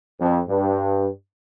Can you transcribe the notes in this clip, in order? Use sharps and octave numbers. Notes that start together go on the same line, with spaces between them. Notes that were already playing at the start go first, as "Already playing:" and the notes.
F2
G2